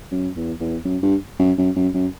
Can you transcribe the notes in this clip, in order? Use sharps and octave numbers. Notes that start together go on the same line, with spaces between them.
F#2
E2
E2
F#2
G2
F#2
F#2
F#2
F#2